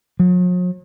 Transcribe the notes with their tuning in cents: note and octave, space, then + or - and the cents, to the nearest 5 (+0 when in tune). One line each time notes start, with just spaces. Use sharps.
F#3 -45